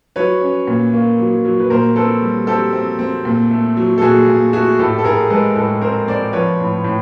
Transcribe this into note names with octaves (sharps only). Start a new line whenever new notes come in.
F#3 B4 C#5
C#4
A#2
A#3
F#3
F#3
B4
A#2 A#4 C5
C4 A4 B4
G3
C4 G4 A4
C4
C4
A#2
A3
F#3
A4
A#2 F#4 G#4
A#2
A3 F#4 G#4
A2 G4 A4
A4
A2 G#4 A#4
G#3 A4 B4
A2 A4 B4
C4 A#4 C5
C4 C5 D5
F3 B4 C#5
A2
A2